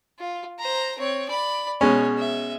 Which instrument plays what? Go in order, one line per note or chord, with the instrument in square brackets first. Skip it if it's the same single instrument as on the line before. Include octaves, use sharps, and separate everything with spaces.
[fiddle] F4
C5 A#5
C4 C#5
D5 B5
[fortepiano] B2 G#3 C#4 [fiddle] C#5
[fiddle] E5